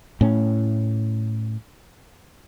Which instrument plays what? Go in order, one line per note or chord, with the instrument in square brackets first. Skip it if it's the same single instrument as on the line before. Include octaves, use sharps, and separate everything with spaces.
[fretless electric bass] A2 C#4